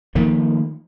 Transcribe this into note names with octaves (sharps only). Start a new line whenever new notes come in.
D#3 F3 A3 A#3